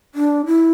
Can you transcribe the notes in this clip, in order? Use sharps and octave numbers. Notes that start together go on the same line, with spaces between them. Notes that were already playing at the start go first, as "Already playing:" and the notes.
D4
E4